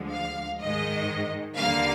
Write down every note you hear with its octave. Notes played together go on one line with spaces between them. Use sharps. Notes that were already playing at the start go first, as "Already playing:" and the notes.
Already playing: D2 D3 F3 G#3
F5
G#2 D#3 G#3 D#5
D#2 D3 G3 A#3 F5